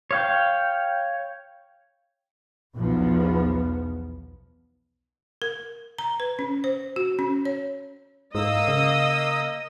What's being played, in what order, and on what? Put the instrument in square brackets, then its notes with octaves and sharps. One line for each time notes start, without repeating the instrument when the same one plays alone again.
[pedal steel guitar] C#5 F5 G5
[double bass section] B1 E2 F3 B3
[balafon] A#4
A#5
B4
C#4
C5
F#4
C#4
C#5
[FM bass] G#2 [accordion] A#3 D#6 E6 [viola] D#5
[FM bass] C#3